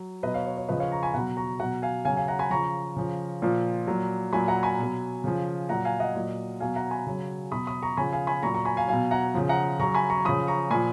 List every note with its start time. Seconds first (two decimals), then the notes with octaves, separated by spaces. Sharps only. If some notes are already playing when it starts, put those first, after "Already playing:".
Already playing: F#3
0.23 B2 F#3 B4 D#5
0.34 C#5 F5
0.46 C#5
0.57 C#5
0.69 C#3 F3 B4 D#5
0.80 C#5 F5
0.91 A#5 C#6
1.03 G#5 B5
1.14 B2 F#3 F#5 A#5
1.37 A#5 C#6
1.60 B2 F#3 F#5 A#5
1.82 F5 G#5
2.05 C#3 F#3 F5 G#5
2.16 F5 G#5
2.28 F#5 A#5
2.39 G#5 B5
2.51 C#3 F3 A#5 C#6
2.97 C#3 F3
3.42 A#2 F3
3.88 A#2 F#3
4.33 A#2 F#3 G#5 B5
4.48 F#5 A#5
4.63 G#5 B5
4.78 B2 F#3
5.24 C#3 F3
5.69 A#2 F#3 F#5 A#5
5.85 F5 G#5
6.00 D#5 F#5
6.16 A#2 F#3
6.60 B2 F#3 F5 G#5
6.76 F#5 A#5
6.91 G#5 B5
7.07 C#3 F#3
7.52 B2 F#3 B5 D#6
7.67 B5 D#6
7.82 A#5 C#6
7.97 C#3 F3 G#5 B5
8.13 F5 G#5
8.27 G#5 B5
8.43 A#2 F#3 A#5 C#6
8.54 A#5 C#6
8.65 G#5 B5
8.77 F5 G#5
8.88 B2 F#3 F5 G#5
9.11 F#5 A#5
9.34 C#3 F3
9.49 F#5 A#5
9.79 C#3 F#3 A#5 C#6
9.95 G#5 B5
10.10 A#5 C#6
10.25 C#3 F3 B5 D#6
10.48 A#5 C#6
10.70 A#2 F3 G#5 B5